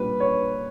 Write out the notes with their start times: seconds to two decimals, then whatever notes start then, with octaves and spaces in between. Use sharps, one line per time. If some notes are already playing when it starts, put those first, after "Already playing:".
Already playing: A#2 G3 B4
0.20 C#5